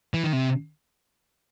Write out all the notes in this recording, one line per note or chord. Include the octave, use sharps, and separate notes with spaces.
E3
D#3
C3